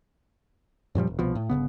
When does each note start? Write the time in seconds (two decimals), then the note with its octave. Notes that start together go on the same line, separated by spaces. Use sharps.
0.95 F#2 A#2 F3 G3
1.07 E1
1.19 C2 B2 F3
1.35 A2
1.50 G1 F2 C#3 B3